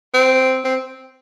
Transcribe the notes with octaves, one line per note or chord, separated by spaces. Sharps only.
C4
C4